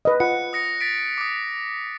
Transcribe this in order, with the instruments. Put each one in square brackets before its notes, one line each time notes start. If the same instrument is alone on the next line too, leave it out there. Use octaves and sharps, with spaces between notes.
[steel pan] B4 D#5
[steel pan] F4 F#5 B5 [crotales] F#6 C#7
[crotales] D#6 A#6 C#7
A6 B6 D7
D6 D#6